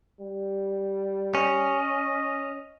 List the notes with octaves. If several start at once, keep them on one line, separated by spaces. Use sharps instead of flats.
G3
C#4 D#5